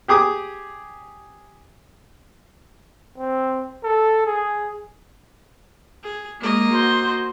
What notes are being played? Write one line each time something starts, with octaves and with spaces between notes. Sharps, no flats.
G4 G#4 D6 D#6
C4
A4
G#4
G#4
G#3 A#3 D#5
F#4 C5